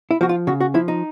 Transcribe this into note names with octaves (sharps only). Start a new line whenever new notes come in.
E4
F3 F#4
F4
C#3 F#4
F#4
F3 E4
D#4